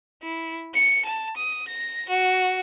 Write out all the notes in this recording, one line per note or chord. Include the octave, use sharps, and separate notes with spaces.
E4
C#7
A5
D#6
A#6
F#4